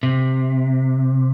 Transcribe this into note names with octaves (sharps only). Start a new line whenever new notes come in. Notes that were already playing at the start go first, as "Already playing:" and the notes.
C3